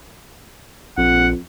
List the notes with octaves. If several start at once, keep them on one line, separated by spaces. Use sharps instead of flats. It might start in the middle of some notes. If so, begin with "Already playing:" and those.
A#1 F2 F#5